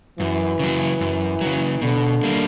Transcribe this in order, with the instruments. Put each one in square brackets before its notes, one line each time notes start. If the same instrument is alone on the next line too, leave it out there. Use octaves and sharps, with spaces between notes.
[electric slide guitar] F#2 [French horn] E3
[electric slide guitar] C#3 F#3
F#2
C#3 F#3
[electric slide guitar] B2 [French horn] D3
[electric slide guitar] G3 A#3